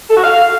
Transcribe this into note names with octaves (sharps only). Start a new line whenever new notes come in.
A4
F#4
F5